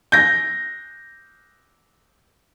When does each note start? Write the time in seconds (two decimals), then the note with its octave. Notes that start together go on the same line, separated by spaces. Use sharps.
0.12 G6 A#6